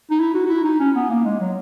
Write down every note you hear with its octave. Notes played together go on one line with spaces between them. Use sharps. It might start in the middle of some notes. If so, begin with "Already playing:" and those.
D#4
E4
F#4
F#4
E4
D#4
C#4
B3
A#3
G#3
F#3